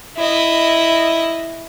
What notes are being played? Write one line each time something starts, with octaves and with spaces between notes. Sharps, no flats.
E4 D#5